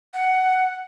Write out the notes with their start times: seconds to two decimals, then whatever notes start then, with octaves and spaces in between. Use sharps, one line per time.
0.13 F#5